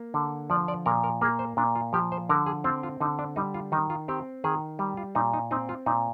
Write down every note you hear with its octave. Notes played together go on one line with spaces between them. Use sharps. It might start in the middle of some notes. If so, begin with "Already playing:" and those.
Already playing: A#3
D3
F3 D5
D5
A#2 A#4
A#4
A#3 G#4
C5
A#2 D4
F4
F3 G4
C5
D3 A#4
G#4
C4 F4
F4
D3 D#4
D4
G3 D#4
F4
D#3 D#4
F4
C4 G4
D#3 G#4
G3
F4
A#2 D#4
D#4
C4 D#4
F4
A#2 D#4